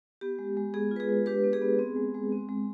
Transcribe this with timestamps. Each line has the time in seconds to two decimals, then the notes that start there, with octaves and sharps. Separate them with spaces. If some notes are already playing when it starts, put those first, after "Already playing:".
0.21 B3 G4
0.39 G#3
0.57 G#3
0.74 B3 G#4
0.91 F4
0.96 B4
1.00 G#4
1.09 G#3
1.26 D4 G4 B4
1.44 B3
1.53 G#4
1.62 B3
1.79 C4
1.96 G#3
2.14 G#3
2.32 C4
2.49 G#3